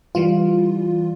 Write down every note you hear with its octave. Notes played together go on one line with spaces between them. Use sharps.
E3 G3 F4